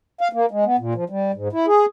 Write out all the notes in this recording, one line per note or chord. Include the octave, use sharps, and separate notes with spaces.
F5
A#3
G#3
B3
A#2
F3
G3
G#2
E4
G#4